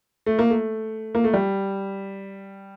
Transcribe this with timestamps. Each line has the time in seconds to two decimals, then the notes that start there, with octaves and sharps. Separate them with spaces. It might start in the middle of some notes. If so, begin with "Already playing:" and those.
0.26 A3
0.39 A#3
0.50 A3
1.15 A#3
1.24 A3
1.33 G3